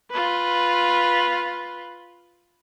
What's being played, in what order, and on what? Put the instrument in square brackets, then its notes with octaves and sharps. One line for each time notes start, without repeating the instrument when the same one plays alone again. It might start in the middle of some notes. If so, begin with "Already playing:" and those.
[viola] F4 B4